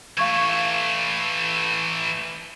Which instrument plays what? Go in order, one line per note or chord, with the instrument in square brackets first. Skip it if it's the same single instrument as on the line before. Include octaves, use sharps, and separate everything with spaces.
[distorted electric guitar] E3 A3 [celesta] F5 C#6 G#6